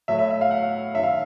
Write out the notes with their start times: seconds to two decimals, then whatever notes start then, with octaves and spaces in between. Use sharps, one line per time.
0.08 A2 F#3 A3 E5
0.19 E5
0.31 E5
0.41 F5
0.51 F#5
0.94 F#2 D#3 F#3 E5
1.03 F5